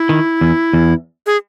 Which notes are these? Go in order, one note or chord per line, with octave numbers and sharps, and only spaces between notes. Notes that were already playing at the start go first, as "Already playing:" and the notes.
Already playing: E4
D#3
E2
E2
G#4